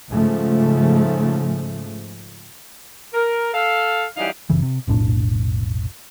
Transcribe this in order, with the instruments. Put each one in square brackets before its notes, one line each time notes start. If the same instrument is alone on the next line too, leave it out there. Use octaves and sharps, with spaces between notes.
[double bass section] G#2 C#3 F3 A3
[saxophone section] A#4
A4 F5
F#2 E3 G3 D#4 F5
[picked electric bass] F#1 C#3 E3
C3
F1 B1 A2 D4